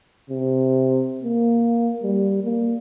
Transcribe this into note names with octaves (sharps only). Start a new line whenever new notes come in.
C3
A#3
G3
A#3